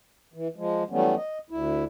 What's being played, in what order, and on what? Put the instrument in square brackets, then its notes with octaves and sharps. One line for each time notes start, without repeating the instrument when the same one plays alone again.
[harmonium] E3
F3 G#3
E3 F#3 G3 A3 B3 C#4
D#5
D2 E4